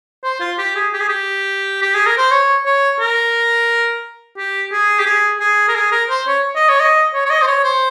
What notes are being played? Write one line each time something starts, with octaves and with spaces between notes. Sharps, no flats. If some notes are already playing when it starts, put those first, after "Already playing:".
C5
F4
G4
G#4
G4
G#4
G4
G4
G#4
A#4
C5
C#5
C#5
A#4
G4
G#4
G4
G#4
G#4
A#4
G#4
A#4
C5
C#5
D#5
C#5
D#5
C#5
C#5
D#5
C5
C#5
C5